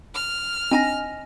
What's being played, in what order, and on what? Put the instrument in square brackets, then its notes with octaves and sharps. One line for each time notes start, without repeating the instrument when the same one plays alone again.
[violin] F6
[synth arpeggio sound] C4 D4 D#4 [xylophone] D#5 G#5 A#6